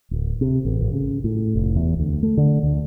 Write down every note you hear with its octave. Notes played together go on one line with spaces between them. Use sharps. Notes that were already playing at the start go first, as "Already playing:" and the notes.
D1
C3
A1
G#1
C#3
A2
F1
E2
D2
A3
D3
D2